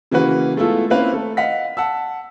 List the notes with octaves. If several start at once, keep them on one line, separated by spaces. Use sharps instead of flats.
C#3 E3 A#3 F#4 B4
G#3 A3 B3 E4 F4 A4
A#3 C4 C#4 E4 B4 F5
A3 A4
D#5 F5 F#5 B6
F#5 A5 E6